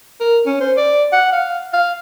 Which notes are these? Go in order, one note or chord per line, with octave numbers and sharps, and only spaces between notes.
A#4
C#4
C5
D5
F#5
F5
F5